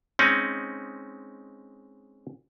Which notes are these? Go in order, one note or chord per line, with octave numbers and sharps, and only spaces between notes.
G#3 C4 C#4 D#4